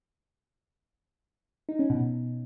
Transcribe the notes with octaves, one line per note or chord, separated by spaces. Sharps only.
D#4
C#4
B2
B2